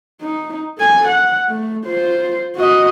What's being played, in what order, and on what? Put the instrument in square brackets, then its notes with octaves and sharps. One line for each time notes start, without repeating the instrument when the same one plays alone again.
[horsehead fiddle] D#4
A4 G#5
F#5
A3
F4 C5
F#4 D#5